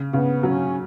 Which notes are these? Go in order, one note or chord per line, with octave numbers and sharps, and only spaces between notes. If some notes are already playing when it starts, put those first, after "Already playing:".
Already playing: C#3
C#3 B3
F#3 C#4